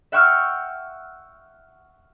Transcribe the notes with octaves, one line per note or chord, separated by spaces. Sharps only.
E5 F#5 G5 C#6 E6 F6